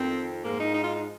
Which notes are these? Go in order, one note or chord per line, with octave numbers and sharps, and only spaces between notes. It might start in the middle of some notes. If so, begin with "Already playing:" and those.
Already playing: F2 D#3 C4
G#2 F3 A#3
D#4
D#4
F4
D#4